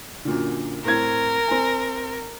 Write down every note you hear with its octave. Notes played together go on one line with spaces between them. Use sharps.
F#2 A#2 D3
A2 C4 A#4 G#6
C4 G#5